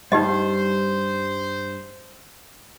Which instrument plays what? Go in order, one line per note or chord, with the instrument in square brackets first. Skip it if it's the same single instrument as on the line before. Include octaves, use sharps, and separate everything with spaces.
[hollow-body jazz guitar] G2 G3 [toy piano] D#4 G4 D#5 [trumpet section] C5